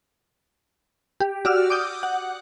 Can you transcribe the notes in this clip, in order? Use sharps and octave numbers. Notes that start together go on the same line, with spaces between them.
G4
F#4 D5 E6 F6
D6 D#6 G6
F#5